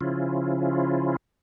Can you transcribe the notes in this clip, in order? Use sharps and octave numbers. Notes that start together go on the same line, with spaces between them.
C#3 F3 C#4 E4 F4